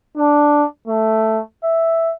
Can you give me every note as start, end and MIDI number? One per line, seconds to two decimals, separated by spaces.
0.17 0.64 62
0.88 1.40 57
1.64 2.12 76